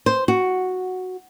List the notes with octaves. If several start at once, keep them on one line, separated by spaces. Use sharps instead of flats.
C5
F#4